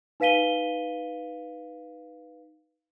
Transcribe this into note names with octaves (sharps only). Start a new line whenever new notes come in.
D#4 B4 F5 B6 D#7 G7